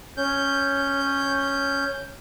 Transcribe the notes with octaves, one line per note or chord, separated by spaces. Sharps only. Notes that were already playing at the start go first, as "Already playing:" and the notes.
C#4 G6